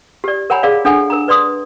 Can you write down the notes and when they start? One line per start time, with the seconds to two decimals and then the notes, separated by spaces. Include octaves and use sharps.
0.24 G4 D5
0.50 A#4 C#5 F#5 G#5 A#5 B5
0.63 G#4 A#4 D5 F5
0.85 D4 A4 F#5 G#5
1.10 A#4 A#5
1.28 B4 D5 C6 D#6